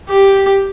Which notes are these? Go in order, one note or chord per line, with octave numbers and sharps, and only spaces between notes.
G4